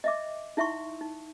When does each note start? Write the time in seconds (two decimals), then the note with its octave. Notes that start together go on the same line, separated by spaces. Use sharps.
0.04 D#5 E5 D6
0.57 D#4 E4 E5 F#5 C6 C#6
1.01 D#4